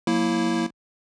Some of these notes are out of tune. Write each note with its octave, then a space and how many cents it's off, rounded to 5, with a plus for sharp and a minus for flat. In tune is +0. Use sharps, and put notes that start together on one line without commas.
F#3 -30 A#3 +0 E4 +0